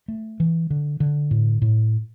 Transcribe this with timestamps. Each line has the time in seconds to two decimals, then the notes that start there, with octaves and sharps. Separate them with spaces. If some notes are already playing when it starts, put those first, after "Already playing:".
0.08 A3
0.40 E3
0.70 D3
1.00 D3
1.31 A2
1.62 A2